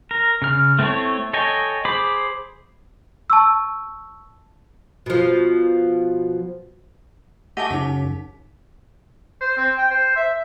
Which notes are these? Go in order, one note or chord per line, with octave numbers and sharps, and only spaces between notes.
A#4
C#3 F6
A3 C4 E4 A4 C#5
A4 C#5 D#5 G5 G#5
G#4 C5 B5 D6
A5 C#6 E6
B2 F3
A3 G4 D#5 F#5 G#5 A5
F#2 C#3 D#4 B6
C5
C4
G5
C5
E5